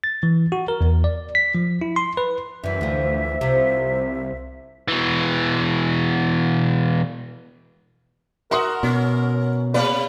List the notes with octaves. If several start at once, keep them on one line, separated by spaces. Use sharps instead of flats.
A6
E3
F#4
A#4
E2
D5
B6
F3
E4
C6
B4
F#2 E3 G3 E5
D2 E3 F3
C2 C3 F3
B2 E3
F#4 A#4 E5 C6 D#6
B2 C#4
C3 A#3 B4 D5